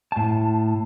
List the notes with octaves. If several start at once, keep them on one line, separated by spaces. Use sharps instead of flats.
A2 A5